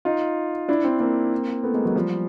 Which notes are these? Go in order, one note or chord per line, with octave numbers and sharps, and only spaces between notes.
D#4 F4
D4 E4
C4 D4
A#3 C4
A3 B3
G#3 A#3
F#3 G#3
F3 G3